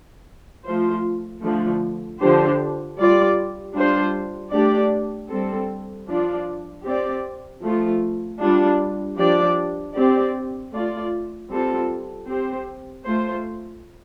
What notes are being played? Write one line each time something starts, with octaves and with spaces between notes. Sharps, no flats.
F3 A3 F4 C5
D3 F3 A3
D3 F3 D4 G4 C5
G3 F4 D5
G3 D4 F4 C5
A3 D4 G4 D5
G3 C4 A4
F3 D4 F4 D5
C4 G4 D5
F3 A3 F4
G3 D4 F4
F3 D4 G4 D5
C4 G4 D5
A3 F4 D5
G3 C4 F4 A4
C4 G4 C5
A3 F4 C5